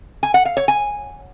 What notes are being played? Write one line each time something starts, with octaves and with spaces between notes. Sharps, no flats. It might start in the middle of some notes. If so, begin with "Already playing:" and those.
G#5
F#5
F5
C#5
G#5